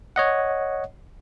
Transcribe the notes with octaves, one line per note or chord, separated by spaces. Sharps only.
C#5 D#5 F#5